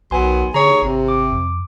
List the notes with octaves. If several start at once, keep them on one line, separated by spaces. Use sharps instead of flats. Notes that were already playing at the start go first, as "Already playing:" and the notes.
B1 D#3 F#3 B3 G#5 C6
D#2 D3 G#4 C#5 A#5
G#1 C3
D6
F2